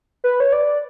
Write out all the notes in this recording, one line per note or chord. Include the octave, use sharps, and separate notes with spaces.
B4
C#5
D5